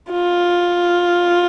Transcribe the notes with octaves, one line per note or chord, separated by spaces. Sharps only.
F4